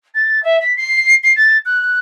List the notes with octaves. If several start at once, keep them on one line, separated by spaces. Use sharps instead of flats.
A6
E5
B6
C7
C7
A6
F#6